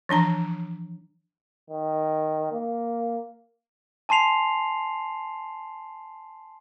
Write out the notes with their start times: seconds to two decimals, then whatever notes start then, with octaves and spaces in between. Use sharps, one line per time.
0.09 E3 F3 D4 A#5
1.70 D#3
2.52 A#3
4.09 G#5 A5 C6 C7 F7